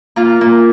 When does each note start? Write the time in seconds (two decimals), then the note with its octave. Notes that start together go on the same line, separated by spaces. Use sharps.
0.16 A#3 F4
0.41 A#3